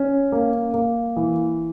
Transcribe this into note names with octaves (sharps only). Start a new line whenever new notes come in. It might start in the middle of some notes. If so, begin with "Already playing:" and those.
Already playing: C#4
A#3
A#3
E3